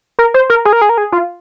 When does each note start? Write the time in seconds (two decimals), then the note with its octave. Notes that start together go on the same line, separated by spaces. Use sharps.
0.19 A#4
0.34 C5
0.50 A#4
0.65 G#4
0.73 A#4
0.82 G#4
0.89 A#4
0.98 G#4
1.12 F4